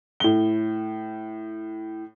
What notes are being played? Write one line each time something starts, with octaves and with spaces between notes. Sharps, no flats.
A2 G7